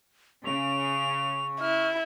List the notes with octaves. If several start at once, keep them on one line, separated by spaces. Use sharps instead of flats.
C#3 C#6 F7
E4 F6